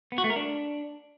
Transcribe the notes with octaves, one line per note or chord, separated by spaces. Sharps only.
B3
F#4
A3
A#4
D4